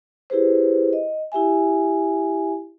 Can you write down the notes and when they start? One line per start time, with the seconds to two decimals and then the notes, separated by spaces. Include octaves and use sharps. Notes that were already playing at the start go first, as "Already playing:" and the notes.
0.30 E4 G4 G#4 B4 C5
0.93 D#5
1.32 E4 G4 E5 G#5